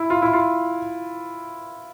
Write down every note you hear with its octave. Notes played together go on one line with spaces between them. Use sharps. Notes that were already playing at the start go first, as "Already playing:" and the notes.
Already playing: E4
F4
E4
F4